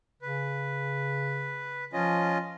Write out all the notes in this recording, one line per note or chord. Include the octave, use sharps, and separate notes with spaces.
C#3 B4
F3 C#4 F4 D#5